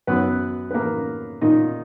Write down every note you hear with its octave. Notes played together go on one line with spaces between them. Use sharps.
F#2 D#3 B3 B4
B4
A#3 A#4
A#2 D#3 D#4